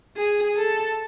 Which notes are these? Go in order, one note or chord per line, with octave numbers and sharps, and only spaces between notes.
G#4
A4